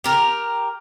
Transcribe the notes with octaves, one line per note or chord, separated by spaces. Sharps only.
G4 A#4